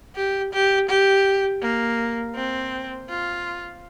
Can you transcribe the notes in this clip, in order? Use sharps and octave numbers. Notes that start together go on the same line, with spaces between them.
G4
G4
G4
A#3
C4
F4